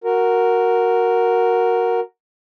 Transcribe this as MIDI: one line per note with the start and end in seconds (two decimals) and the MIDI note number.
0.04 2.00 66
0.04 2.00 70